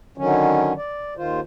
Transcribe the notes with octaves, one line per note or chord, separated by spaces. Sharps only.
D3 D#3 F#3 C#4
D5
D#2 D#3 F4 C5